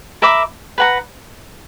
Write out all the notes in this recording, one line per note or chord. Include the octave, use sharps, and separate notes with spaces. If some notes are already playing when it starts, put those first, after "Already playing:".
A#4 E5 B5 D6
B4 F#5 A#5